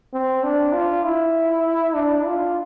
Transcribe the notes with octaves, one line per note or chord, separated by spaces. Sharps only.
C4
D4
F4
E4
D4
F4